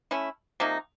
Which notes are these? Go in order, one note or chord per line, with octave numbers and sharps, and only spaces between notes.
A3 C#4 E4
C3 F3 A#3 D#4